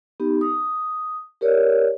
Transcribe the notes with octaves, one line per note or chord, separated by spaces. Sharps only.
B3 D#4 G4
D#6
G4 A#4 C#5 D5